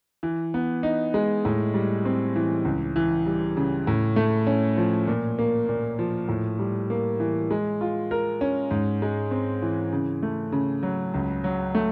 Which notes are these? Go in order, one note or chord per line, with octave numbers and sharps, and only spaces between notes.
E3
B3
D#4
G#3
A2
G3
C4
E3
C#2
E3
G3
C#3
A2
A3
C#4
F3
A#2
A#3
A#2
F3
A2
G3
A#3
E3
G#3
F4
A#4
C#4
G#2
G#3
C4
E3
C#3
A3
C#3
F#3
C#2
F#3
A3